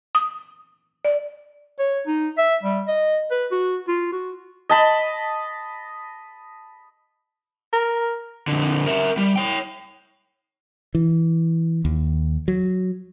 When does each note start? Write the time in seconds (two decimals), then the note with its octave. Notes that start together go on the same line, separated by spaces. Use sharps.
0.15 D#6
1.05 D5
1.79 C#5
2.07 D#4
2.38 E5
2.63 G3
2.88 D#5
3.31 B4
3.51 F#4
3.88 F4
4.12 F#4
4.69 D#5 A5 B5
7.73 A#4
8.48 F2 D3
8.86 A#4 E5
9.17 G3
9.36 C#5 G5
10.95 E3
11.85 D#2
12.48 F#3